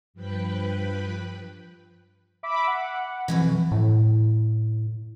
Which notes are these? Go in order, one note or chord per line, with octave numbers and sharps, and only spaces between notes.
G2 F3 B4 G5 B5 F#6
E5 B5 D6
F#5
F2 B2 E3
A2